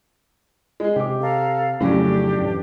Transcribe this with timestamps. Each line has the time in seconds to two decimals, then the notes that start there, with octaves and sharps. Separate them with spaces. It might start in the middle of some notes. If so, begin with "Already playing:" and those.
0.80 G#3 G#4
0.96 C3 G4 D6
1.21 A4 F5 A#5
1.80 F2 A2 C#3 F#3 C#4 D4 G4
2.41 F#2 A2 E3